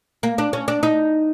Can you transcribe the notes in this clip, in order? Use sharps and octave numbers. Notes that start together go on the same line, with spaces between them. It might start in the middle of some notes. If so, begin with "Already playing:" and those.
A#3
D4
C#4
D4
D#4